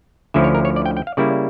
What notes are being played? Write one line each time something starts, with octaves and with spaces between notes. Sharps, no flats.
D2 D3 F3 C#4 E4 E5
C#5
A#4
C#5
D5
G5
G5
F5
C#3 G3 A#3 E4 D5